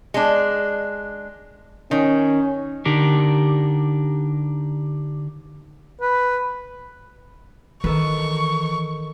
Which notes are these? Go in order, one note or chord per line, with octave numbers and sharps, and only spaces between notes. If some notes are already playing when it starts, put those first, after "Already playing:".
G#3 D4
D#3 C#4
D3 D4 D#4 G4 A#4
B4
D#3 E3 A4 B4 C#6